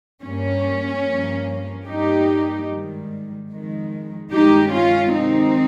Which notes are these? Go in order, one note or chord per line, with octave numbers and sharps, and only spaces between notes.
G2 G3 A#3 C#4
G2 F3 A#3
G2 G3 A#3 D#4 G4
G#2 D#3 G3
F2 D#3 G#3
G2 D#3 G#3 D#4 G4
C#4 F4
C3 D#3 G#3 C4 D#4